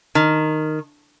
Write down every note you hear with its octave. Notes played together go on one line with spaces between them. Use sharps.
D#3